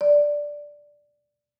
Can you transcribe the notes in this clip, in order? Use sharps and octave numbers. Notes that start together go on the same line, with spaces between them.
D5